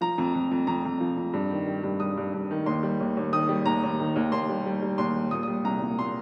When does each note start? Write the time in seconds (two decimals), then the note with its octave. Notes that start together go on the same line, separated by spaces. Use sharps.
0.01 F3 A#5
0.18 F2
0.34 F2
0.51 F2
0.67 F2 A#5
0.85 F2
1.00 F3
1.17 F2
1.33 G2
1.51 D#3
1.67 G3
1.83 G2
2.00 G2 D#6
2.17 G2
2.33 G2
2.51 D#3
2.66 D#2 C6
2.83 G3
3.00 D#2
3.17 D#2
3.33 D#3 D#6
3.49 G3
3.65 D#2 A#5
3.83 D#2
4.00 D#3
4.16 D#2
4.32 D#2 C6
4.49 G3
4.66 G3
4.82 G3
4.98 D#2 C6
5.16 G3
5.31 A#2 D#6
5.43 G3 D#6
5.64 C2 A#5
5.82 A#2
5.99 A#2 C6